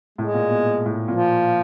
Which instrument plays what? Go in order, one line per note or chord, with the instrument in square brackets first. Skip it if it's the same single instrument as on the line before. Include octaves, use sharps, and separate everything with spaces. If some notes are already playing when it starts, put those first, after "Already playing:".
[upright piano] A2 [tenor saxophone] G#3
[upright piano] A#2
B2
A2
[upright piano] A#2 [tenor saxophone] F3